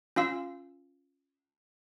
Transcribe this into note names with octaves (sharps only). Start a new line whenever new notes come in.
C#4 F4 F5 E6